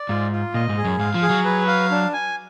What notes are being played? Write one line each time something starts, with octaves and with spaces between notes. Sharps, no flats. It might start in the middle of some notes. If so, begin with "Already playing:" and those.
Already playing: D5
G#2 F4
F4
A#2 D#5
G#2
G#4
F#2
G#2 F5
F3
G#4
F#3
B4
F5
D4
G#5